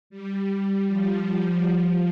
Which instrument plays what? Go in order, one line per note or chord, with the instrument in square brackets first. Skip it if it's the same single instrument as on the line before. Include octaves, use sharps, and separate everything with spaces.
[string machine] G3
F3
F3